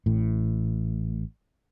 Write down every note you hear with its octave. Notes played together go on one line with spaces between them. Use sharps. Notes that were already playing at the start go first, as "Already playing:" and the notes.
A1 A2